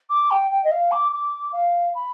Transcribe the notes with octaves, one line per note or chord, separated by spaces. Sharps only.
D6
G5
G5
D#5
F5
D6
D6
F5
B5